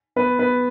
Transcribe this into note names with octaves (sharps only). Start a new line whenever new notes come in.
B3 B4
B3 B4